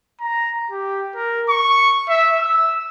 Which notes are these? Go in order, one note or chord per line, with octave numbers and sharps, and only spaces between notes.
A#5
G4
A#4
C#6
E5
E6